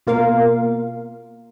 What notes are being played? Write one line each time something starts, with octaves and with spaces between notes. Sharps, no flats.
B2 A#3 F4 A#4 F5